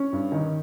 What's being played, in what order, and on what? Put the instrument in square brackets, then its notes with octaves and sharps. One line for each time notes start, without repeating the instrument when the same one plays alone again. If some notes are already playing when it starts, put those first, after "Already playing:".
Already playing: [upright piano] C#4
G2
D#3